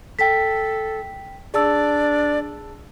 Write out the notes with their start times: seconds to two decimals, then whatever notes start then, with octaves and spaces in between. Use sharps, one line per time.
0.19 A4 G5 B6
1.54 D4 G#4 D5 A5 E6